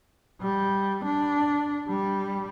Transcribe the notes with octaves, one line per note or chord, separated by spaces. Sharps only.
G3
D4
G3